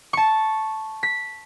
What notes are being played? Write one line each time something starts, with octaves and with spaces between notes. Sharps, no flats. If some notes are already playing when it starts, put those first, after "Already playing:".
A5 C#6
B6